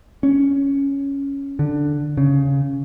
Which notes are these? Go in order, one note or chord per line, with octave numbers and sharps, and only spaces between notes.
C#4
D3
C#3